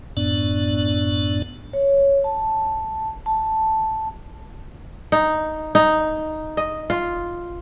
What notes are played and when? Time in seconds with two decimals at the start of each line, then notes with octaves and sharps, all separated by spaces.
0.17 F#2 A2 B3 D4 D5
1.73 C#5
2.24 A5
3.26 A5
5.12 D#4
5.75 D#4
6.57 D#5
6.90 F4